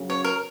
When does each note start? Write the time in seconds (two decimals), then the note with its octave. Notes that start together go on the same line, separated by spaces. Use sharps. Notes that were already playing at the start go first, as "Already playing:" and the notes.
Already playing: F#2 C#3 F#3 C#4
0.10 C#5
0.24 A#4